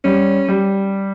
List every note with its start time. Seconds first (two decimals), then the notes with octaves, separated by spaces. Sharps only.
0.04 G3 C#4
0.48 G3